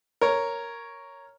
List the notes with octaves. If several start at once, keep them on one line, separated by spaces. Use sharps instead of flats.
A#4 C#5